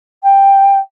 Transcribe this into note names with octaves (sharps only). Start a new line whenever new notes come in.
G5